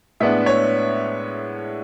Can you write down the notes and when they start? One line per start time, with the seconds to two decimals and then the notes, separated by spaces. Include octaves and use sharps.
0.20 A2 G#3 B3 D4 E5
0.46 C#5